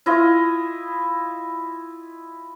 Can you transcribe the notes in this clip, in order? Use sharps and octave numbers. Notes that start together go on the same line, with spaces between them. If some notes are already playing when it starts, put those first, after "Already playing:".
E4 F4 D#5